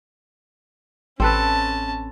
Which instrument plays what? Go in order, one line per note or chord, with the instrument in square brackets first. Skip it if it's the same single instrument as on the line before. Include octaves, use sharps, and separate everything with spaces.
[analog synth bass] A1 [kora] C4 A4 B4 [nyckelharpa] C#4 A5